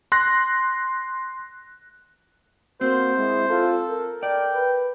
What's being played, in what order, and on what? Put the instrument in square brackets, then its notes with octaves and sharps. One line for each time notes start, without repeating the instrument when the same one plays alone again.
[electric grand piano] C6 F#6 A#6
[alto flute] A#3 [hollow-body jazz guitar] C4 [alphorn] F#4 [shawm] C5
[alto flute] G#3 [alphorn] E4
[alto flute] F4 [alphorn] A4
[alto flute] A#4
[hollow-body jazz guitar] D5 [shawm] G5
[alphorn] B4